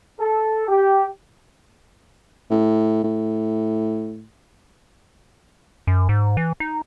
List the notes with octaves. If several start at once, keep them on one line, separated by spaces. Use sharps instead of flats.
A4
G4
A2
A2
F#2
G#2
E3
D#4